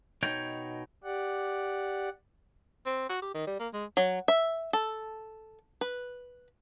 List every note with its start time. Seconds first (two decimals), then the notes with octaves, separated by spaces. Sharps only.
0.23 B2 D#4 C#5 G5
1.04 G4 D5 F#5
2.86 C4
3.09 F#4
3.22 G4
3.34 D#3
3.47 G3
3.60 A#3
3.73 G#3
3.97 F#3
4.28 E5
4.73 A4
5.81 B4